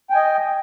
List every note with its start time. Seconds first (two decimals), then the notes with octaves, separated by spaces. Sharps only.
0.10 G5
0.13 G#5
0.16 D#5